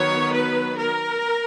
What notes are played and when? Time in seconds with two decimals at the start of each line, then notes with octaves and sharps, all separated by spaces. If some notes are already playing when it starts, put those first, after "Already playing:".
Already playing: D#3 F#3 B3 C#5
0.34 B4
0.77 A#4